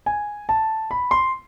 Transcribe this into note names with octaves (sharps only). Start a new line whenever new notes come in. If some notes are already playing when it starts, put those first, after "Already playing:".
G#5
A5
B5
C6